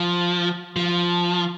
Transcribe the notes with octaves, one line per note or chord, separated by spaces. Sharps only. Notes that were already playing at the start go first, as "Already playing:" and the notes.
Already playing: F3
F3